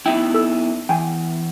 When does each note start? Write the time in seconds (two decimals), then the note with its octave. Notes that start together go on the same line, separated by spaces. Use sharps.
0.06 B3 D#4 E4 G5
0.34 A4 E6
0.89 E2 G5 G#5